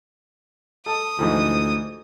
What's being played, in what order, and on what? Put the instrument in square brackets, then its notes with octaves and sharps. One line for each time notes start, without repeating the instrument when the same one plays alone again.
[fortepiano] A4 A5 [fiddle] D#6
[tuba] D2 [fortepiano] G#2 E3 F3